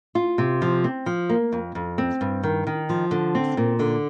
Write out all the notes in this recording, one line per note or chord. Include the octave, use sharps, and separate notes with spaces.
F4
C3
F3
C4
F3
A#3
F2
F2
C4
G2
D#3
D#3
F3
D3
C4
A#2
D3